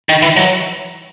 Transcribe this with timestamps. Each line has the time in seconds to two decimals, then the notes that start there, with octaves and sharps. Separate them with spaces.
0.09 D#3
0.22 E3
0.36 F#3